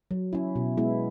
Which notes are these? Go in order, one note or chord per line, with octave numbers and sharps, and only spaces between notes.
F#3
C#4 E4
B2
G#3 B3 E4